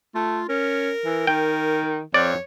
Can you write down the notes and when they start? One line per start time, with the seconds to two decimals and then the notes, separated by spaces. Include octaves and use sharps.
0.15 A3 F4
0.49 C#4 A#4
1.05 E3
1.27 D#3 G5
2.14 F2 C#5 D5